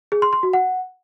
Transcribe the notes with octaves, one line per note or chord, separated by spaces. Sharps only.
G#4
C6
C6
F#4
F#5